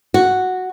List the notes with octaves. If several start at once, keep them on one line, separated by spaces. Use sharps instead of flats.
F#4